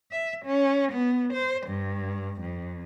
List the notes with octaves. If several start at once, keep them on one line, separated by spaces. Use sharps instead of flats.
E5
C#4
B3
C5
G2
F2